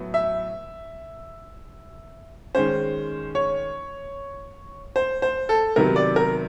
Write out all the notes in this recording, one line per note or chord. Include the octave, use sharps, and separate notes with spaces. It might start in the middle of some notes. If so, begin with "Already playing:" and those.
Already playing: A2 F#3 B3
E5
D#3 G#3 C#4 C5
C#5
C5
C5
A4
C3 D#3 F#3 B3 A#4
D5
A#4